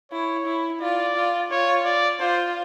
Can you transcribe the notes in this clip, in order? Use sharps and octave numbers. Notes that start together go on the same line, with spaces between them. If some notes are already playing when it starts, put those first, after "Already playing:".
E4 C#5
E4
F4 D5
F4
F4 C#5
D5
F4 C5